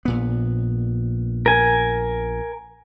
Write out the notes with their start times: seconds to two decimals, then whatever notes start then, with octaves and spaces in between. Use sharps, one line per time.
0.05 A#1 A#2 B3
1.46 A#4 G#5